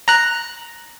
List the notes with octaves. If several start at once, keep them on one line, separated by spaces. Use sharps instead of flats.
A#5 F#6